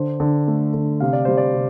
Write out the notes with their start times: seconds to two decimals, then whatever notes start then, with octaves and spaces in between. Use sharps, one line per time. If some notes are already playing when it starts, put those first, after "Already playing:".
Already playing: D3 C5
0.20 D3
0.48 A3
0.74 D3
1.00 C3 F5
1.13 D5
1.25 G3 C5
1.37 D5
1.54 C3